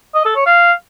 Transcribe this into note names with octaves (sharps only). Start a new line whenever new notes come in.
D#5
A4
C#5
F5